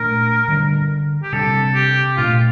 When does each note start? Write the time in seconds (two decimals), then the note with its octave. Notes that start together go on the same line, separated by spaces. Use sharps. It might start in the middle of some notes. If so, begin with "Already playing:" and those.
Already playing: A#2 A3 D4 A#4
0.48 D3 G3 A#3 D4
1.23 G4
1.32 C3 G3 D4 A4
1.75 G4
2.17 A#2 A3 D4 F4